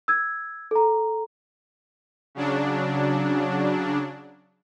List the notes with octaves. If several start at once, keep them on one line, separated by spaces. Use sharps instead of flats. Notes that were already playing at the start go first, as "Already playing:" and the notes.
E6 G#6
A4 A#5
C#3 F#3 D4